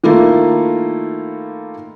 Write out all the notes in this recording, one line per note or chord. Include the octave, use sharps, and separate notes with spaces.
D#3 A3 A#3 E4 F4 A4